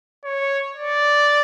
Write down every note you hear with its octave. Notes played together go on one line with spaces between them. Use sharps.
C#5
D5